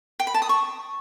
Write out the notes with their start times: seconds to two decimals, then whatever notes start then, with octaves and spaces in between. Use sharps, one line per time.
0.20 G5
0.27 B5
0.34 A5
0.42 D#6
0.49 C#6